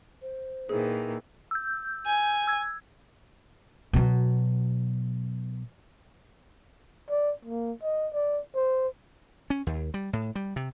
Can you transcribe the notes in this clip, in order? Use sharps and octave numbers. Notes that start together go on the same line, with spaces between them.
C5
A#2 D#3 E3 G#4
E6 G6
G#5
E6 G#6
B2 F#3
D5
A#3
D#5
D5
C5
C#4
D#2
G3
A2
G3
C3